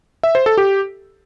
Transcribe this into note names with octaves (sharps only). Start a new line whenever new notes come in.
E5
C5
A4
G4